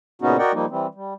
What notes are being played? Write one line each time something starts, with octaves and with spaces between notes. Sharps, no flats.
A#2 C#3 B3 C#4 D#4 F#4
F#4 A#4 D5 D#5 F#5 G5
F3 G3 A#3 D#4
E3 G3 C4
G3